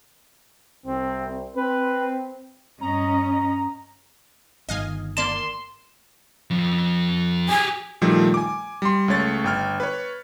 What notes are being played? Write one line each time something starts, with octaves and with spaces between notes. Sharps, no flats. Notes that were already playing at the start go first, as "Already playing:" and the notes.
C2 C4
C4 B4
G2 C#4 D#5 A#5
G1 D#3 D#5 F5 G#5
A#3 D5 A5 C6 E7
F2
G4 G#4 G#5
A#2 D#3 F3 G3 A3
G#5 D6
G3 C6
C#2 A3 C#5 A6
G1 G5 F6
B4 C#5